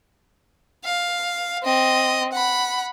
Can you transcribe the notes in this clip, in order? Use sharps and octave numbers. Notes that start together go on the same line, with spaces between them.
F5
C4 D#5
F#5 B5